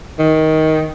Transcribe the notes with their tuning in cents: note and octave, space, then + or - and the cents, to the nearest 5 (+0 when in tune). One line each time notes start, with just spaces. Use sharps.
D#3 +15